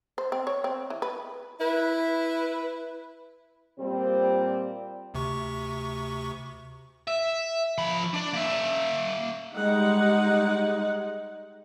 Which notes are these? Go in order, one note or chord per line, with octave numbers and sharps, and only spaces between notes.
C5
C4
C#5
C4
E3
B4
E4 B4
A#2 G3 C4
D2 C3 C#6
E5
F3 B5
D4 D5
A#3 E5
G3 G#3 D#4 F#5